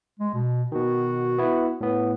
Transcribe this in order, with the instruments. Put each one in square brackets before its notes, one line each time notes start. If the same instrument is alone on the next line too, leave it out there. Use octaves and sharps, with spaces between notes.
[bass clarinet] G#3
B2
[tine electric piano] B2 D#3 [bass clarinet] F#4
[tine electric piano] B3 E4
A2 B3